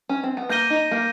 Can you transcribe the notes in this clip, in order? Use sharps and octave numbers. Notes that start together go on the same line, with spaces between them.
C#4
C4
B3
A#3 G6 A#6 D#7 G7
D#4
A#3